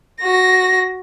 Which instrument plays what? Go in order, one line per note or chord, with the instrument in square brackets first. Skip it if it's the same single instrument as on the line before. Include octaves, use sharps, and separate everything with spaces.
[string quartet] F#4 A#6